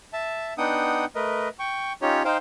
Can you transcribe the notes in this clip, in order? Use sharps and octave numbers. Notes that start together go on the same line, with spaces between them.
E5 A5
B3 D4 D#4 F#5 G5 D#6
A3 A#4 B4 D#5
G5 C#6
C#4 D#4 F4 G4 C#5
D#4 C5 F5 G5